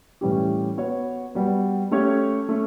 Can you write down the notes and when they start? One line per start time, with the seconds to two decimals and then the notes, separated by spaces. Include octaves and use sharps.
0.21 A2 E3 G3 C#4 G4
0.77 B3 F#4 C#5
1.35 G3 B3 F#4
1.91 A3 C#4 G4 C#5
2.49 A3 C#4